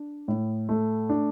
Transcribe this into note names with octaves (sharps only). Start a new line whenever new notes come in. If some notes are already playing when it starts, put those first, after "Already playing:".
Already playing: D4
A2
A3
D4